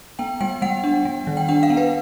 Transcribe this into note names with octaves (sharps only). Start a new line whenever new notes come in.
B3 G5
G3 G5
G3 F#5
D4
G3
D#3
G5
D4 F#5
F5
B3
B4